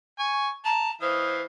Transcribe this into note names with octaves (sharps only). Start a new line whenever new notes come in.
G#5 C#6
A5 A#5
E3 C5 D#5 F5